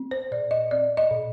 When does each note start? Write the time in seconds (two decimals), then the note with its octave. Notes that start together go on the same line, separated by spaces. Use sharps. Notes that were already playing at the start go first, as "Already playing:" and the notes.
Already playing: C4
0.11 C5
0.31 A#2 D5
0.51 D#5
0.71 C4 D5
0.97 D#5
1.11 A#2